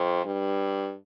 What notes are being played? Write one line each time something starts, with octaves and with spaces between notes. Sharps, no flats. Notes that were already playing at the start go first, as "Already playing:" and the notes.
Already playing: F2
G2